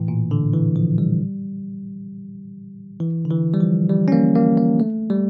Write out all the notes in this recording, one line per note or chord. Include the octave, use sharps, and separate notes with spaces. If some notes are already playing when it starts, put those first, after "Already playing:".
Already playing: A2 E3
A#2
D3
E3
F3
G3
E3
D3
E3
G3
F3
G3
C#4
A#3
A#3
A#3
A3
G3